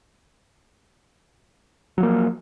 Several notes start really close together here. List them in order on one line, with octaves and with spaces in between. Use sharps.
F#3 F3 A#3